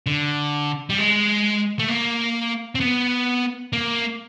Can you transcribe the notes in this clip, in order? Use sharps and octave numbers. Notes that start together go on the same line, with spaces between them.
D3
G3
G#3
A3
A#3
C4
B3
A#3